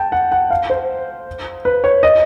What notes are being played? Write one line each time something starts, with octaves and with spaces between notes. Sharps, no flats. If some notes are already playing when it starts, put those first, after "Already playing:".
Already playing: G5 A5
F#5
F#5
F5
C5
B4
C#5
D#5